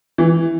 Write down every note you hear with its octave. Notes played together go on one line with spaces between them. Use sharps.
E3